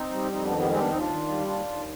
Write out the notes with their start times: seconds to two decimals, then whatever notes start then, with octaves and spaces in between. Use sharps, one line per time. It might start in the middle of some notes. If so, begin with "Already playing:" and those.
Already playing: C4 D#4
0.12 G3
0.32 F2 C4 D#4
0.44 B3 D4
0.51 D#3
0.57 G3 B3
0.69 G3 G#3 C4
0.80 B3 D4
0.89 D#2 C4 D#4
0.99 D4 F4
1.09 D#3
1.28 G3
1.46 D#2 D4 F4
1.66 D#2